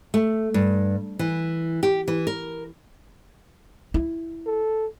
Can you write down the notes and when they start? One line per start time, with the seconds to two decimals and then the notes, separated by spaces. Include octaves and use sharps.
0.14 A3
0.54 G2
1.19 E3
1.83 G4
2.08 E3
2.27 A#4
3.94 E4
4.46 A4